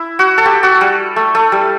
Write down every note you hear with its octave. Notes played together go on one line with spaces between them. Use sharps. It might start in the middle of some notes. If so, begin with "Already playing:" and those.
Already playing: E4
F#4
A4
G4
F#4
G3
A3
A3
G3